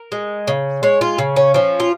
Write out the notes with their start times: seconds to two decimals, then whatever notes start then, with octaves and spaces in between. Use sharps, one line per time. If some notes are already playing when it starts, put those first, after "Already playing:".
Already playing: A#4
0.12 G#3
0.47 C#3
0.83 G#3 C#5
1.01 F4
1.18 C#3
1.36 C#4
1.54 F3 C#4
1.80 F4